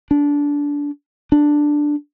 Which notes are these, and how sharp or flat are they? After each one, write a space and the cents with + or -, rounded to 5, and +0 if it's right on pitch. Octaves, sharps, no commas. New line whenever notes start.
D4 -20
D4 +5